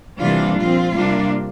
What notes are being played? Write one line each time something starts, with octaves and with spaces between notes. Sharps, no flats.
C3 E3 G3 A#3 D4 F4
A#2 F3 C4 F4
C3 G3 A#3 D4